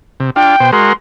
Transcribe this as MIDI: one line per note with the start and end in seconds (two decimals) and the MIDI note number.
0.20 0.30 48
0.36 0.56 62
0.36 0.56 65
0.36 0.70 79
0.60 0.71 47
0.60 0.71 72
0.73 0.93 56
0.73 0.93 66
0.73 0.93 70
0.73 0.93 84